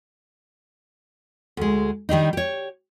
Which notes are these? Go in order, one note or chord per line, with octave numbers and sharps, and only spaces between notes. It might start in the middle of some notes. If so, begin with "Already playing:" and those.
D2 G#3
D#3 G3 D4 D#4
G4 C#5